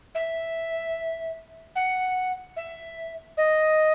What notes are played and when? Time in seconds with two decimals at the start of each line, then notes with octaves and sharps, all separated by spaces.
0.15 E5
1.75 F#5
2.56 E5
3.37 D#5